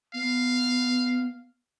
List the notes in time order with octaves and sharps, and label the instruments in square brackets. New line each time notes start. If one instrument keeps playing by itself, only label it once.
[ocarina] B3 [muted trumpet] F5